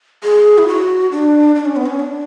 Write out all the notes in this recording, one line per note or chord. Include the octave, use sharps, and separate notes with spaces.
G#4
E4
F#4
D4
D4
C#4
B3
C#4
D4